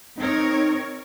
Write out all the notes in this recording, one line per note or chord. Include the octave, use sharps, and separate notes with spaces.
C4 D#4 A#4 C#5